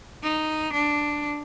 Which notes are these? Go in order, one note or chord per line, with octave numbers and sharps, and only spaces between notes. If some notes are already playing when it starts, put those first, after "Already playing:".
D#4
D4